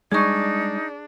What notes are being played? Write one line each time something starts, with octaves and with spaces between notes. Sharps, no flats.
G3 G#3 D4 D#4 G#4 C#6